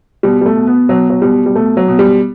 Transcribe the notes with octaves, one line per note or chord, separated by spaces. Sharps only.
B2 G3
G3
A3
B2
B3
B2 F#3
F#3
B2 G3
G3
B2 A3
F#3
B2
G3